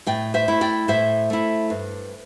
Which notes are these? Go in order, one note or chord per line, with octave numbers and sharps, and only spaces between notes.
A2 D5 G5
C5 E5
A3 E4
D5 G5
A2 C5 E5
A3 E4
G2